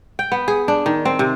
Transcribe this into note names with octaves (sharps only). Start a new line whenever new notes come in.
G5
B3
G#4
D4
D#3
C4
C3